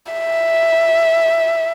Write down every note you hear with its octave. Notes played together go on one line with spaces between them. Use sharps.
E5